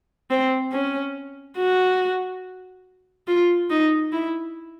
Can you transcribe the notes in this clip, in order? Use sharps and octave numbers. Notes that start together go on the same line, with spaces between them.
C4
C#4
F#4
F4
D#4
E4